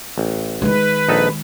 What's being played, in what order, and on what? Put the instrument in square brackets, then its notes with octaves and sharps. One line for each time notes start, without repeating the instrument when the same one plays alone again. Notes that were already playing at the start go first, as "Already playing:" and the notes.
[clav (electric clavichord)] A1
[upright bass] D#3 G#3 [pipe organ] B4
[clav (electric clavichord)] A#1 D#4 A4